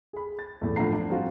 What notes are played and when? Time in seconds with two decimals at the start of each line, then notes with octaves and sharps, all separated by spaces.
0.13 G#4 B5
0.39 A6
0.61 E2 A2
0.76 A2 F3 D4 F#5 A#5 C7
0.93 D4
1.10 F3 G3 C4 F4 F#4